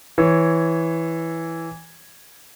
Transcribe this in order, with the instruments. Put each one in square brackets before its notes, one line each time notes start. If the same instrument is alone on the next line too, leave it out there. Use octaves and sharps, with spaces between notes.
[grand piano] E3 C#5